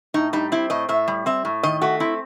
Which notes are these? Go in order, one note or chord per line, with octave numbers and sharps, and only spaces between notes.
A2 D#4
G3 D#4
C4 E4
A2 D#5
A2 E5
G3
C4 E5
A2
D#3 D#5
A3 F#4
C4 E4